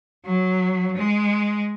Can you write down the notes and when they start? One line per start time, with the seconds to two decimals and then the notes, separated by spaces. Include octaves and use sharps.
0.25 F#3
0.96 G#3